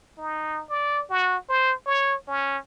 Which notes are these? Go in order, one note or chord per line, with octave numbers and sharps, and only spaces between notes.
D#4
D5
F#4
C5
C#5
C#4